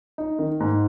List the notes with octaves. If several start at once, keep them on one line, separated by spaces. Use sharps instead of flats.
D#4
D#3
G#2